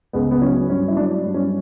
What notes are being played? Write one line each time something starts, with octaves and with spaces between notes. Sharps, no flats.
C#2 B3
B3
F#3 C#4
G2 C#4
E4
F#3 D4
G2
C#4